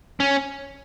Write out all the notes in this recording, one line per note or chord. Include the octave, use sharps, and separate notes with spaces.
C#4